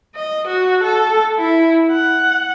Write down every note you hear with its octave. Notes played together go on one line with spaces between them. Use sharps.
D#5
F#4
A4
E4
F#5